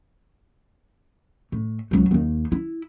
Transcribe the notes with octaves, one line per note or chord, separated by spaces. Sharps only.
A2
C#2 F#3
D#2 D#3
E4